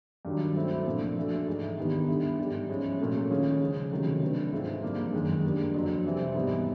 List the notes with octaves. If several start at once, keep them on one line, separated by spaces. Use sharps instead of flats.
G2 D#3 F#3
F#3 A3 C4 E4
A#2 F3 A3 D4
E3 A3 D4 F#4 A4
G#2 E3 G#3
G2 D#3 G3 B3 D#4
D3 G3 B3 E4
G#2 E3 G3
F3 G#3 C#4 E4
A#2 F#3 A3 C#4 F#4
D#3 G#3 C#4 F4 G#4
C#3 F3 G#3
C3 D#3 F#3 A3 C#4
F#3 A3 D4 F#4 B4
G#2 E3 G#3 C4 F4
G2 D3 F3 A#3
F#2 D#3 G#3
G3 A#3 D4
F2 D3 F#3
C3 E3 G3 C4
G#2 E3 G3 B3